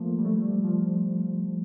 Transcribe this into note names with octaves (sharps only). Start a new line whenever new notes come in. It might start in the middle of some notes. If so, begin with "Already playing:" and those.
Already playing: F3 A3 A#3
G3
A3
G3
F3
F3